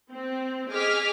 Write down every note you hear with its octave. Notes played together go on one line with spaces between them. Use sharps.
C4
G#4 D#5 G#5 D6 F6 B6